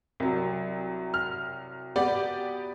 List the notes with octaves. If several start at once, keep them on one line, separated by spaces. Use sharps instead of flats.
C2 F#3
F6
B3 G4 D5